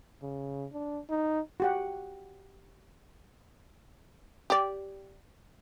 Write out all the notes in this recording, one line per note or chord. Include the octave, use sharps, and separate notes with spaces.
C#3
D4
D#4
F#4 G4 F#5
G4 D5